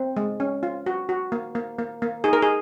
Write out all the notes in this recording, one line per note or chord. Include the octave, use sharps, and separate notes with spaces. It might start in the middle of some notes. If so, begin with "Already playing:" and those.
Already playing: C4
G#3
C#4
F4
F#4
F#4
A#3
A#3
A#3
A#3
D#4 G#4
A#4
G#4